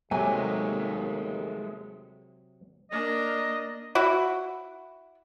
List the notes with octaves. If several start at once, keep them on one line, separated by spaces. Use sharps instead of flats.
D#2 C3 F#3 G#3 A3 G4 G#5
A#3 D4 D#5
E4 F#4